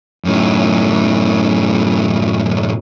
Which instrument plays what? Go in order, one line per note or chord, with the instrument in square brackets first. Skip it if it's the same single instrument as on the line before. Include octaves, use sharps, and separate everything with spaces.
[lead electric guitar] F#2 A2